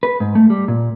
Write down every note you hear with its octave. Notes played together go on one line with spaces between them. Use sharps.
B4
G#2
A3
G3
A#2